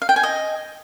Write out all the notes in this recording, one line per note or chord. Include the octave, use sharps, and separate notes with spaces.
F5
G5
G#5
D#5